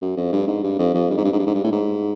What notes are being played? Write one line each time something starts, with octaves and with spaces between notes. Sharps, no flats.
F#2
F2
G2
G#2
G2
F2
F2
G2
G#2
G2
G#2
G2
G#2
G2
A2
G#2